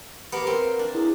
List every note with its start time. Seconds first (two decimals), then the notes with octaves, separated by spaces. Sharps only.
0.32 B3 G4 A#4 F5
0.47 C4 A#4
0.79 D4
0.95 E4 G#4